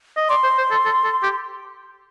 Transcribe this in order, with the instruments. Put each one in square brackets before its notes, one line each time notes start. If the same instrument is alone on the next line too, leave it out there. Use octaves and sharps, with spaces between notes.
[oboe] D#5
[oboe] D5 [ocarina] C6
[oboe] C5
C5
A4
A4
A4
G4